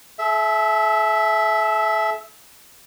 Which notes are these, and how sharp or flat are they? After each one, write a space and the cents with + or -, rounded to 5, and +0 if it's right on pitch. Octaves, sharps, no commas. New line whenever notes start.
A4 -45 E5 +0